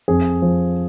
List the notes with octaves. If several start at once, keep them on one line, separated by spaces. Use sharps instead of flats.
F2 G#4
F3